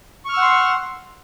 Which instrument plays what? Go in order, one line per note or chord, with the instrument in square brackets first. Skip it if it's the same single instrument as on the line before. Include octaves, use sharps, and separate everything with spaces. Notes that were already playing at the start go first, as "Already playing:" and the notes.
[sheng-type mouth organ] C#6
F6
E6
F#5
C6